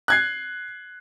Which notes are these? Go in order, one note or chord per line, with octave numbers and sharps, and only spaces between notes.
F#6 G#6 C7